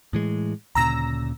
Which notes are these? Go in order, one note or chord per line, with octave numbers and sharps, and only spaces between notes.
A2 E3 G#3
D2 A#2 C#3 A#5 E6 A#6